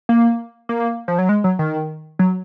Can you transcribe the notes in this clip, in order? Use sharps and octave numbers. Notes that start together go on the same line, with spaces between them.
A#3
A#3
F3
F#3
G#3
F#3
D#3
F#3